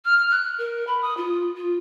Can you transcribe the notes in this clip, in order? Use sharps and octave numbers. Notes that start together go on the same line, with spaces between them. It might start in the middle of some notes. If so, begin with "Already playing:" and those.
F6
F#6
A#4
B5
D#6
F4
F4